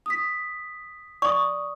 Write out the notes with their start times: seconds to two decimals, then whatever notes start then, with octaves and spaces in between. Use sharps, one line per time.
0.06 D#6 B6
1.22 D5 C#6 D#6